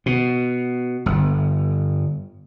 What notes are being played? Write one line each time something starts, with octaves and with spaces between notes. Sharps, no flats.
B2
G1